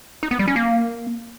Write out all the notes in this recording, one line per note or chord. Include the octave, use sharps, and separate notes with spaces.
D#4
B3
G3
C#4
A#3